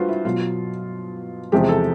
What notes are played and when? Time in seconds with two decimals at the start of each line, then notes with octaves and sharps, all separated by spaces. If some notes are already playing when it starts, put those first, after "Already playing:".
Already playing: G2 F4 F#4 B4 C5
0.09 E4
0.25 B2 F#3 F4
1.52 E2 C3 F3 G#3 G4
1.69 A4